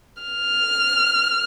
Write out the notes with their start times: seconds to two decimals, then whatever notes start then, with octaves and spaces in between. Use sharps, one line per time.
0.23 F6